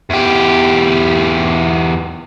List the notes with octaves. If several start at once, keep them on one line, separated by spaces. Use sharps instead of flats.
E2 G4